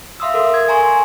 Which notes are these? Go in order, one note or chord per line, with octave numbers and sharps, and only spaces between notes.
E5 F5 C6 D#6 E6
A4 A#4
G#6
G#5 A#5 C6 C#6